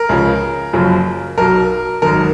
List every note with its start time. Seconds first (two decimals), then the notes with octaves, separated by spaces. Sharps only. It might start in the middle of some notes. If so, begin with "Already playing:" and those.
Already playing: A#4
0.09 C#2 C#3 F3
0.73 F#1 F#2 C#3 F3
1.38 B1 B2 A#4
2.02 G#1 F#2 D#3 A#4